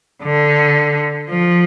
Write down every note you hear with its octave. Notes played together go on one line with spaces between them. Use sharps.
D3
F3